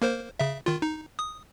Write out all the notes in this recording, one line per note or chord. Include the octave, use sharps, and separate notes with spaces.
A#3 A#4 C5
C#3 E5
D#3 F4
D#4
D#6